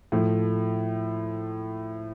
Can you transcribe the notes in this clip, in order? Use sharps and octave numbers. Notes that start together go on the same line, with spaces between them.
A2 F3 A3